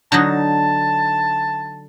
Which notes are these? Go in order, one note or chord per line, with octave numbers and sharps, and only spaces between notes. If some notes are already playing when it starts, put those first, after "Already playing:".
D3 F#3 D#4 A5